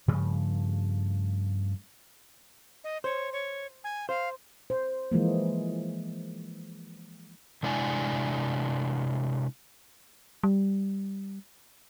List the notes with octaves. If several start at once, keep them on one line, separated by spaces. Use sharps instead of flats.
G2 C#3 F3 A3
D#5
C5 C#5
C#5
G#5
C5 F5
C5
E3 F3 G#3 A#3
C3 G#3 D4 E4 F#5 G#5
G3